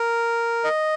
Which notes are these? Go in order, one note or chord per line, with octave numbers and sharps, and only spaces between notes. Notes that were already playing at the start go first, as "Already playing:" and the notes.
Already playing: A#4
D#5